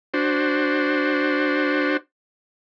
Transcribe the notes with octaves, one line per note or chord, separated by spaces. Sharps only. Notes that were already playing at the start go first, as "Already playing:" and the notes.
D4 F#4 C5